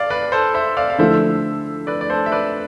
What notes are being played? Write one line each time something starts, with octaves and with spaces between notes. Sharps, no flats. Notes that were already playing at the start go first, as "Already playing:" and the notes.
Already playing: D5 F5
B4 D5
A4 C5
C5 E5
D5 F5
F5
D3 F3 A3 E4 A4 C5 E5
B4 D5
D5
A4 C5
E5
B4 D5